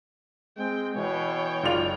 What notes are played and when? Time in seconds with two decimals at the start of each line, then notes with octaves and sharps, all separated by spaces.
0.58 G#3 C4 G5
0.96 B2 E3 C#5 G5
1.63 F#1 B1 F4 D5 F7